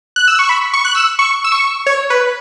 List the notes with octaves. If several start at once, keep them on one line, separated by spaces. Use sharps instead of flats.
F#6
E6
C#6
B5
C#6
F#6
E6
C#6
E6
C#6
C#5
B4